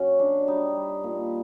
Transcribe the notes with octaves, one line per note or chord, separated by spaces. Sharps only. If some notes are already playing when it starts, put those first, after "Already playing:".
Already playing: F#2 C#4 F#4
F#3 D4
G3 D#4
G3
A#2